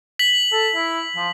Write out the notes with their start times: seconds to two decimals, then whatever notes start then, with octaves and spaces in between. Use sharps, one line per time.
0.19 B6 F#7
0.52 A4
0.75 E4
1.16 F3